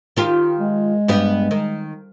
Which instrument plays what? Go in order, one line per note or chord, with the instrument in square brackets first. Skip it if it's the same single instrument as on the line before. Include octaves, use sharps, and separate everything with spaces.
[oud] D#3 F4 G4
[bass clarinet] G#3
[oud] G2 B3 G4
D#3